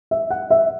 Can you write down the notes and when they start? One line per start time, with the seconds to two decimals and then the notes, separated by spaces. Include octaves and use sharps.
0.11 E5
0.30 F#5
0.51 E5